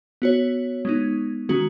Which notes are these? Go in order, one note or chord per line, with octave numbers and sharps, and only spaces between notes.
B3 F#4 C#5
G#3 B3 D#4
D#3 G#3 C#4 F#4